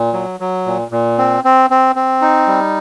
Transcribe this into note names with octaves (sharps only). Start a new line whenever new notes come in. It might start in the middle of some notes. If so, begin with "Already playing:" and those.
Already playing: A#2
F#3
F#3
A#2
A#2
C4
C4
C4
C4
D#4
G3